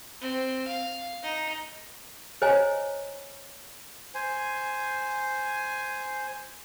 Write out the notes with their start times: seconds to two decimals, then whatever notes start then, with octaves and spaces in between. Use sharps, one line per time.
0.21 C4
0.67 F5
1.23 D#4
2.42 C5 C#5 D#5 G#5 A#5
4.15 C5 G#5